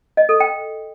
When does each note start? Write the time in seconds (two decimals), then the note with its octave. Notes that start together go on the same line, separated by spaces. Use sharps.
0.17 D#5
0.29 A4
0.40 G5